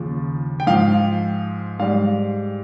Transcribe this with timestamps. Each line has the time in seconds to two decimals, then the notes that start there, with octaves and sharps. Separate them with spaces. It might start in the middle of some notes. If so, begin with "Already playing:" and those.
Already playing: D#2 C#3 F3
0.60 G5
0.67 G#2 F3 F5
1.79 G#2 G3 F5